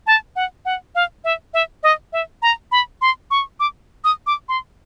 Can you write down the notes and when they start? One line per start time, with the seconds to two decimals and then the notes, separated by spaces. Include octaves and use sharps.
0.07 A5
0.36 F#5
0.65 F#5
0.95 F5
1.24 E5
1.54 E5
1.83 D#5
2.13 E5
2.42 A#5
2.72 B5
3.01 C6
3.31 C#6
3.60 D6
4.04 D#6
4.27 D6
4.49 C6